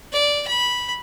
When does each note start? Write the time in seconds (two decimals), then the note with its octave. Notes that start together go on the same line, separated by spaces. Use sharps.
0.12 D5
0.47 B5